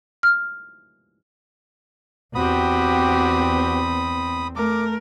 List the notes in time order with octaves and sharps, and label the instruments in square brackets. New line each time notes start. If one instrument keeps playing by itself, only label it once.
[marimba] F6
[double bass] E2 C4 [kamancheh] F#4 G4 [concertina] B5 D#6
[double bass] A3 [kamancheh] A#4 [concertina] D6